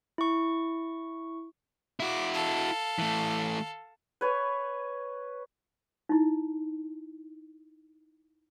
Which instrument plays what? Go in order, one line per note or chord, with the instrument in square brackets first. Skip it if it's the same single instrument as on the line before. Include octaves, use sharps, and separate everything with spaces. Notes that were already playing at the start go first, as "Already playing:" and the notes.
[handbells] E4 C#6
[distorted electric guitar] E4 F#4 [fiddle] D6
[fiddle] A4 F5
[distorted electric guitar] E3 A3
[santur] B4 C#5 G#5
[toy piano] D#4 E4